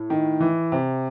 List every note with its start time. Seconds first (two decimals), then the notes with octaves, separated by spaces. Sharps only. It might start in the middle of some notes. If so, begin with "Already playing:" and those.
Already playing: A2
0.10 D#3
0.40 E3
0.72 C3